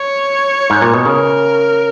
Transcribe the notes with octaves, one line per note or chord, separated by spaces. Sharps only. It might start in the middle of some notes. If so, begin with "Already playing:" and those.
Already playing: C#5
G#2
A#2
B2
C#3 A#4